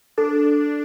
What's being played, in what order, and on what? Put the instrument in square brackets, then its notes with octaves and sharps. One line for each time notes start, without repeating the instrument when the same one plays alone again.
[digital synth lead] D4 [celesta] A4